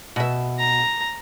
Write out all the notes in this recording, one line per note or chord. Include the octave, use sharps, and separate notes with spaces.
B2 E5
A#5